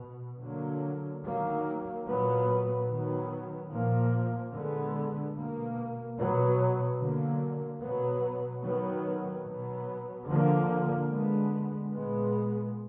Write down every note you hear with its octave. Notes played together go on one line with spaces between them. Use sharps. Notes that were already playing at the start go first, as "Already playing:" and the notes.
Already playing: B2
D3 F#3 A#3
D#3 F#3 A#3
A#2 F#3 B3
D#3 F#3 B3
A#2 F3 A#3
D3 G#3 B3
B2 A#3
B2 F#3 B3
D3 F#3 A#3
B2 F#3 B3
D#3 F#3 B3
B2 F#3 B3
D3 F3 A#3
D3 G#3 B3
A#2 G#3 B3